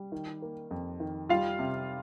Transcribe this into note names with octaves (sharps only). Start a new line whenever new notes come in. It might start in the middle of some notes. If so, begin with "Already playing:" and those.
Already playing: G3
D#3
A#3
F2
D#3
G3 F4 F5
C3